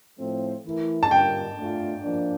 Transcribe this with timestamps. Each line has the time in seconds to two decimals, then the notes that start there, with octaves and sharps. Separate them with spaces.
0.19 A2 F3 A3 C4
0.64 E3 A3 E4 A#4
1.03 A5
1.11 D3 G3 A#3 F4 A#4 G5
1.57 A3 D4 F4
2.04 F3 A#3 D4